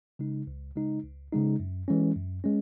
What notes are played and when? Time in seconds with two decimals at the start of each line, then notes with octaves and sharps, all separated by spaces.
0.19 C#3 G#3 D#4
0.47 C#2
0.75 C#3 G#3 D#4
1.04 C#2
1.32 C#3 G#3 D#4
1.60 F#2
1.88 E3 G#3 C#4
2.16 F#2
2.44 G#3 C#4